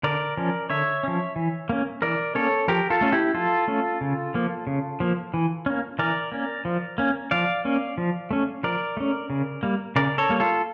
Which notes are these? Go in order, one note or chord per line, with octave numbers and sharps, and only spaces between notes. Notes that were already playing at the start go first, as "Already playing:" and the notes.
D3 A#4 D5
F3 C#4
D3 C#5 E5
F3 C#4
E3
A#3 C#4
E3 A#4 D5
A#3 C#4 A4 C#5
F3 G4 A#4
F4 A4
A3 C#4
E4 G4
F3 F4 A4
A3 C#4
C#3
F3 A#3
C#3
F3 A#3
E3
A#3 C#4
E3 A#4 D5
A#3 C#4
F3
A#3 C#4
F3 D5 F5
A#3 C#4
F3
A3 C#4
F3 A#4 D5
A3 C#4
C#3
G3 A#3
C#3 A#4 D5
A4 C#5
G3 A#3
F4 A4